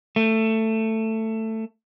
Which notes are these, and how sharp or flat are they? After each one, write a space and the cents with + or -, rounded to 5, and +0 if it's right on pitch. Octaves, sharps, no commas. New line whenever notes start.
A3 +15